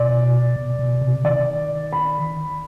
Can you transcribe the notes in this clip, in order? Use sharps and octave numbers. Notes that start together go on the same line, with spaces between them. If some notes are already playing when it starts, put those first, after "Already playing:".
Already playing: B2 D5
B2
B2
C3
D#3 D5
B5